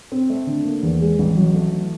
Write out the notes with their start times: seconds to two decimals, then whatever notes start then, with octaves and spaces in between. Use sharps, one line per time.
0.12 C4
0.30 A3
0.47 D3
0.66 A#3
0.83 E2
1.01 G#3
1.19 A1
1.37 F#3
1.54 A3
1.72 E3